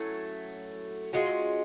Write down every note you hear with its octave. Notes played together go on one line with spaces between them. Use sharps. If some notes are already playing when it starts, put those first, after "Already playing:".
Already playing: F#3 A3 C#4 E4
G#3 C#4 F4 F#4